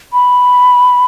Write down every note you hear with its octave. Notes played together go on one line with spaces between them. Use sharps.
B5